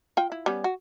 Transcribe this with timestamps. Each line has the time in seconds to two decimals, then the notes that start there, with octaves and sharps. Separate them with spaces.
0.17 F4 G5
0.32 E4
0.46 G3 B3 C#4
0.64 F#4